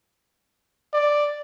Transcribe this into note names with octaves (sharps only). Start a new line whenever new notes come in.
D5